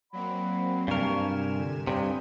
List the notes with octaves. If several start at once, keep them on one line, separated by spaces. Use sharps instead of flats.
F#3 A#3 C4 D5 F#5 B5
G2 C3 A#4 F5 G#5 A5 C#6 E7
A#2 D3
G2 C3 C4 G5 G#5 D#6